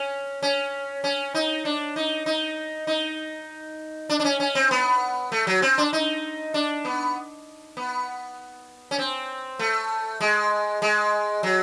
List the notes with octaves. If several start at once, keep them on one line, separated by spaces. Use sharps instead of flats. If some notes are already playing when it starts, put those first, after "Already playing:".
Already playing: C#4
C#4
C#4
D#4
D4
D#4
D#4
D#4
D4
D4
C#4
C#4
C4
B3
A3
F#3
C4
D4
D#4
D4
B3
B3
C#4
C4
A3
G#3
G#3
F#3